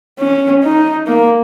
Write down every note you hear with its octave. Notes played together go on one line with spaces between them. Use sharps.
C#4
D#4
A#3